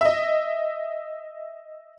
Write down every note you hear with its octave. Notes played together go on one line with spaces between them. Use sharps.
D#5 E5